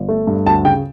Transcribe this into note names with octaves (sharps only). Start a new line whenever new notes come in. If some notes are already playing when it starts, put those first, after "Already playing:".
Already playing: G1
A3
G2
D2 A5
C#3 G5